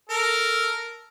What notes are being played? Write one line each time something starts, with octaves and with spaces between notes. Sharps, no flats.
A4 A#4